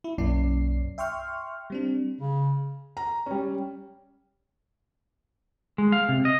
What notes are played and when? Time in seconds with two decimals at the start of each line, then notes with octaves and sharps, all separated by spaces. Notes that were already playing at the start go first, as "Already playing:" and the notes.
0.04 E4
0.18 B1 F#2 A#3 C#4 D5 C7
0.98 E5 G5 C6 C#6 F6
1.70 G3 C4 D4
2.20 C#3
2.97 A#5
3.26 G3 C#4
5.78 G#3
5.92 F5
6.09 C3
6.25 D#5